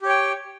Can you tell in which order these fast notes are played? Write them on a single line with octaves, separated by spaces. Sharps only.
G4 C#5 G5